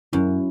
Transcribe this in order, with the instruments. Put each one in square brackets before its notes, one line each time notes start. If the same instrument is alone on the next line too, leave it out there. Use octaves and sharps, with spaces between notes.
[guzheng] F#2 [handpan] F#3 C#4 E4